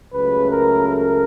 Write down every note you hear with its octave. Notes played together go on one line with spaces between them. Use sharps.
C#2 C#3 F#3 A3 B4
A#4
A#4